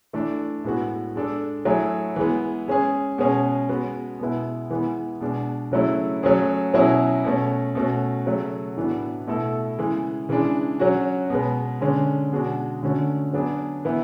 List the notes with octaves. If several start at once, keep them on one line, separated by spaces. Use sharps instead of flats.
E3 A3 D4
A2 G#3 B3 F#4
G#3 D4 A4
F#3 A3 E4 G#4
E3 G#3 B3
G#3 C#4 G#4
B2 G#3 C#4 G#4
G#3 B3 F#4
B2 G#3 B3 E4
E3 G#3 B3
B2 G#3 D4
C#3 F#3 A3 E4
F#3 A3 C#4 G#4
B2 F#3 C#4 E4 G#4
B2 A3 C#4
B2 A3 C#4 F#4
C#3 F#3 A3
A2 E3 B3 D4 F#4
B2 A3 E4 A4
C#3 E3 G#3
C#3 E3 G#3 D4
F#3 C#4 F#4
B2 G#3 B3
D3 G#3 C#4
B2 G#3 D4 F#4
D3 A3 C#4 F#4
F#3 B3 D4 G#4
E3 B3 E4